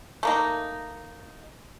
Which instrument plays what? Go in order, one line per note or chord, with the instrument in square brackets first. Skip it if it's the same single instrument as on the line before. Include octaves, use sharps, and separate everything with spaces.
[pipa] A3 A#3 D#4